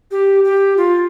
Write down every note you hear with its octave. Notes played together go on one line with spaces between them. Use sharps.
G4
G4
F4